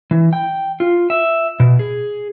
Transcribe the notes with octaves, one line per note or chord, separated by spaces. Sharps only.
E3
G5
F4
E5
B2
G#4